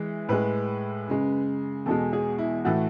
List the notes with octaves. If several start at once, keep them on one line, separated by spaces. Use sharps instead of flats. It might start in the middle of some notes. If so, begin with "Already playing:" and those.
Already playing: E3 G#3
A2 G#3 B4
F#2 C#3 G#3
E2 B2 G#3 A4
G#4
E4
A2 E3 A3 F#4